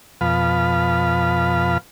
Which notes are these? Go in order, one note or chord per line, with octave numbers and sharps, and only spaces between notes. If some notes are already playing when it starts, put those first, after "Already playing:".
F2 B2 F3 F5 B5